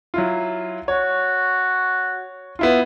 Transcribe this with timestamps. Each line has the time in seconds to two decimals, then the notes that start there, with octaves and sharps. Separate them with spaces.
0.14 F#3 E4 F4
0.88 F#4 C#5
2.59 B3 E4 F4